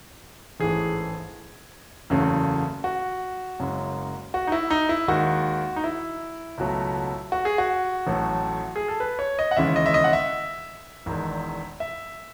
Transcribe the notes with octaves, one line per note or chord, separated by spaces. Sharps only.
A1 G#2 E3 A3 G#4
F#1 E2 C#3 F#3 A3
F#4
F#1 F#2 C#3 G#3
F#4
D#4
E4
D#4
E4
D#2 D#3 G#3 F#4
D#4
E4
C#2 B2 F#3 A3
F#4
G#4
F#4
A1 A2 F#3 A3
G#4
A4
B4
C#5
D#5
F#5
D#2 C#3 E3 G#3 E5
D#5
E5
D#5
F#5
E5
E1 E2 D#3 G#3
E5